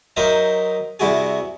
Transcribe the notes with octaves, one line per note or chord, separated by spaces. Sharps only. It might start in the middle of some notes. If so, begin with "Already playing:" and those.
F#3 D#4 A#4 C5 D#5 E5
C3 G3 E4 F#4 G#4